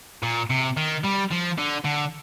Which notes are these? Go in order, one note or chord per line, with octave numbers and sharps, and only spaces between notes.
A#2
C3
D#3
G3
F3
D3
D3